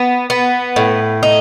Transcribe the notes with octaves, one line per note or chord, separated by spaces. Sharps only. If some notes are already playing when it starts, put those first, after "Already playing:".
Already playing: B3
B3
A2
D#4